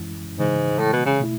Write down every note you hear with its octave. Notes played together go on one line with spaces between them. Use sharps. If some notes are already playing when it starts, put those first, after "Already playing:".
Already playing: F#2 E3 G#3 C#4 E4
G#2 C#3 E3 G#3
A2
B2
C#3
B2 A3 E4